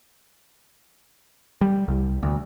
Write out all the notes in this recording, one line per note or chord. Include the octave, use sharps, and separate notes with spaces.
G3
C2
D2